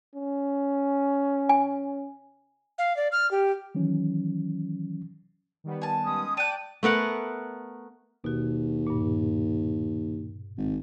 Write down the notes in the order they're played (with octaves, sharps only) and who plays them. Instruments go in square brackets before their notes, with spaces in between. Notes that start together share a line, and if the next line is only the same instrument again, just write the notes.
[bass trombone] C#4
[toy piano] G#5
[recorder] F5
D5
F6
G4
[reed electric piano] D#3 E3 F#3 C#4
[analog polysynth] D#3 G3 B3
[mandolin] G#5 A5
[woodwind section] G#3 C#4 D#6
[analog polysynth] D5 [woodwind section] G5 [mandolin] A5 F#6 [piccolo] D#7
[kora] A3 B3 A#4 F#5
[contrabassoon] D#2 [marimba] B2 F#4
[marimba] G2 A#2
[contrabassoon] G#1